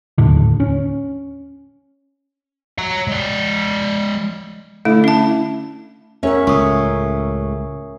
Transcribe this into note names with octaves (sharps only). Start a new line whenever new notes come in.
D1 D#2 A2 D3
C#4
C#5 A#5
G#3 D5
D3 A3 E4
C#4 A5
C#4 A#4 C#5 E5 F#5
C#2 A2 C#6 D#6